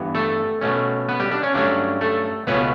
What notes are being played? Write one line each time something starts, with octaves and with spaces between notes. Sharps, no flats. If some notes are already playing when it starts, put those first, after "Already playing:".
Already playing: G2 E3 B3
A3 A4
B2 A3 C#4
B3 B4
G3 G4
D4
C#4
G2 F#3 A3 C#4 D4
A3 A4
C#2 B2 A3 B3 C#4 B4